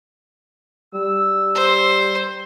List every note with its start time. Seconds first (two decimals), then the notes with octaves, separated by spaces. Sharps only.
0.94 G3 E6
1.55 C5